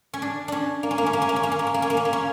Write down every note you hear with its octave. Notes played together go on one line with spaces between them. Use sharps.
C#4
D4
C#4 D4
A#3
C#4
A#3
C#4
A#3
C#4
A#3
C#4
A#3
C#4
A#3
C#4
A#3
C#4
A#3
C#4
A#3
C#4